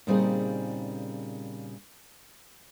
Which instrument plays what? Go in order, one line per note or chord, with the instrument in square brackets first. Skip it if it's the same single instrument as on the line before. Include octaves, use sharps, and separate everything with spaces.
[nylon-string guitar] A#2 C#3 G3 C4 D#4 G#4